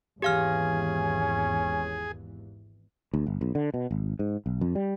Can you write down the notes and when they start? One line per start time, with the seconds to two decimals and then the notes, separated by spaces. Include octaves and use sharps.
0.22 G#1 E2 E3 C#4 G4 G#4 F5 F6
3.14 D2
3.27 G1
3.41 B1
3.55 D3
3.74 B2
3.91 G#1
4.19 G#2
4.46 B1
4.61 F2
4.75 G3